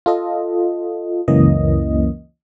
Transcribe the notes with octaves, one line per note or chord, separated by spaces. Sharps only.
F4 A4 D#5
C#2 F#2 E3 A#3 C#4 D#5